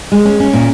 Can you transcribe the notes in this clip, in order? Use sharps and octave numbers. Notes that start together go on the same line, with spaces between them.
G#3
C#4
C#4
A#2